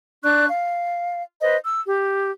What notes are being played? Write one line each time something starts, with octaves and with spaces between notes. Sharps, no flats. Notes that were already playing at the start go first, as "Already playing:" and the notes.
D4 D5 C#6 F#6
F5
B4 C5 D#5
E6
G4